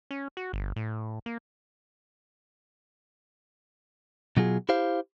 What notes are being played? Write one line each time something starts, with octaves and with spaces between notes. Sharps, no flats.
C#4
F#4
G1
A2
A#3
B2 F#3 F4 G#4
E4 G4 C5 F5